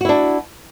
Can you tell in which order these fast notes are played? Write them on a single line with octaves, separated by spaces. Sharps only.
F#4 E4 D4